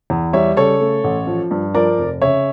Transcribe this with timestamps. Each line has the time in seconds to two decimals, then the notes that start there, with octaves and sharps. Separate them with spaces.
0.10 E2
0.33 G3 C#5 E5
0.57 C#3 A4 C#5
0.81 A3
1.04 A1
1.27 F3
1.51 G2
1.74 F3 A#4 D5
1.98 F1
2.21 C#3 C#5 E5